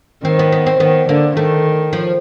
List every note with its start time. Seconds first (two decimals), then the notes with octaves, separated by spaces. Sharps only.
0.24 D#3 C4
0.39 B3
0.52 B3
0.67 C4
0.80 D#3 B3
1.09 D3 A#3
1.36 D#3 A3
1.93 F3